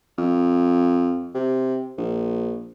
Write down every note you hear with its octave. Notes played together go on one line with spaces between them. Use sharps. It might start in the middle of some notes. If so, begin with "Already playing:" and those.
F2
C3
A#1